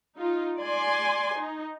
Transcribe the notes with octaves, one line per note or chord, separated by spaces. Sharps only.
D#4 F4
D5 G#5 C6
D#4